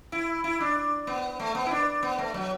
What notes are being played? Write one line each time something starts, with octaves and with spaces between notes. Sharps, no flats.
E4
E4
D4
B3
A3
B3
E4
D4
B3
A3
F#3